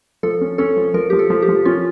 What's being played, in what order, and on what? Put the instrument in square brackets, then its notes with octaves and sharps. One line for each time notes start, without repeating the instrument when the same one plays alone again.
[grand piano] F3 [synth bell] A4
[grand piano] C#4
[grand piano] C#4 [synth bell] A4
[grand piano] F3
[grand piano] F3 [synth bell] A#4
[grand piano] F3 [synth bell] G4
[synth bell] A4
[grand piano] F3
[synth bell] G4
[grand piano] F3
[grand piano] C#4 [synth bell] F4